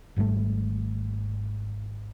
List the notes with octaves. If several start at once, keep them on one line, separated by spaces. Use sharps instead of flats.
G#1 G#2 G3 A3